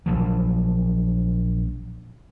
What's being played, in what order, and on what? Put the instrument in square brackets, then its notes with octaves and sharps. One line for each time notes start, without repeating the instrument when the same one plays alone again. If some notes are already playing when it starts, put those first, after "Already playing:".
[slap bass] A#1 F3 F#3